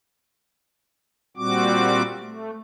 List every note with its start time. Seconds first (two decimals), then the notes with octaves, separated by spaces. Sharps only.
1.37 A#2 G3 C4 F#4 D6
2.21 A3